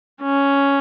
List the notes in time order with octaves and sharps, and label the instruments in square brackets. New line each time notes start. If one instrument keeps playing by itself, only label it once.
[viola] C#4